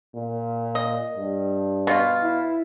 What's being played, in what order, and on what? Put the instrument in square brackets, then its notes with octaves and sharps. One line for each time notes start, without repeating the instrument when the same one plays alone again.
[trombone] A#2
[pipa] D#5
[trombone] G2
[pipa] B2 F4
[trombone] E4